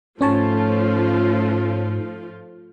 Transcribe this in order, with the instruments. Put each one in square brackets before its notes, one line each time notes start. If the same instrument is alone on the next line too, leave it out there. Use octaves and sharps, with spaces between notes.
[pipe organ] G#2 [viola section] F3 A3 F4 [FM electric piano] C#4 C#5 A5